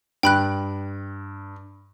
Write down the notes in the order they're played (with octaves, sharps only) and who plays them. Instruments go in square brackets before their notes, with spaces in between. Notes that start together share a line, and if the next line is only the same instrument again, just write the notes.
[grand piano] G2 [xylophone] G5 B5 F#6